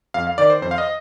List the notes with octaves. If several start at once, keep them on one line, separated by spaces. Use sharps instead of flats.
F2 F5
F5
D#3 D5
C5
F2 C5
F5
D#5